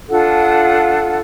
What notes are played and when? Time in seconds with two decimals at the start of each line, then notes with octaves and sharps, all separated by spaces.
0.09 D4 F4 A4 F#5